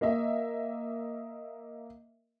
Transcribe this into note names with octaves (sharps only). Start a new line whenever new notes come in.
A#3 D#5 E5